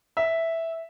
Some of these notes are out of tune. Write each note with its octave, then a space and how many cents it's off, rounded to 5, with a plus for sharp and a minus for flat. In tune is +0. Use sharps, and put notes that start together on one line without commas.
E5 -5